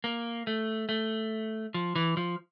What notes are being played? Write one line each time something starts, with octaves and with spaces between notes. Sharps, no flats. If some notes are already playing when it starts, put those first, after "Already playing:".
A#3
A3
A3
F3
E3
F3